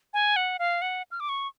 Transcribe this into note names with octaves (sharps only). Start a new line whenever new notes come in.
G#5
F#5
F5
F#5
F6
D6
C#6